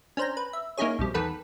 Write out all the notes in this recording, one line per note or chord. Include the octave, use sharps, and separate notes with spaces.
C#4 D4 C5 G5 A#5
B4
E5
A#3 C#4 D#4 E4 G#4 C#5
B1 F2 G3
E2 D#3 B3 A4 B4 B6